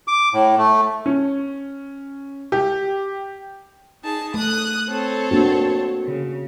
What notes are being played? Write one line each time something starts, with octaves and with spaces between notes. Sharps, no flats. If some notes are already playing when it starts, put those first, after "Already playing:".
D6
A2
A3
C#4
G4
D#4 G#4 A5
A3 D#6 F#6
C4 A4 C#5
A#3 D4 F#4
C#3